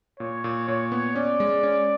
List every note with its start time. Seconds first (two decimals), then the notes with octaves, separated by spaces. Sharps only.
0.20 A#2 C#5
0.44 A#2
0.68 A#2 C#5
0.92 B3
1.16 C#4 D5
1.40 G#3
1.63 C#4